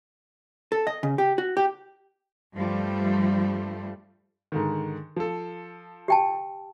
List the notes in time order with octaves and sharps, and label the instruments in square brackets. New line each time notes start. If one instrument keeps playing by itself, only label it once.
[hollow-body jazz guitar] A4
D#5
C#3
G4
F#4
G4
[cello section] G2 F3 G3 A3
[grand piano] G#2 D3 D#3
F3 A4
[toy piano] G4 G5 A5